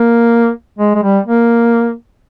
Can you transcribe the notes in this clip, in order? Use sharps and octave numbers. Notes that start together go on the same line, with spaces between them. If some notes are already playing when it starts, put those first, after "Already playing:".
Already playing: A#3
G#3
G#3
G3
A#3